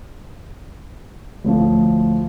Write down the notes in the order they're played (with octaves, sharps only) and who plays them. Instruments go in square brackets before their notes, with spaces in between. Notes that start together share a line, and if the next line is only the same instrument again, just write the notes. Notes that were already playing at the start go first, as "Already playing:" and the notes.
[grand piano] D2 A2 F3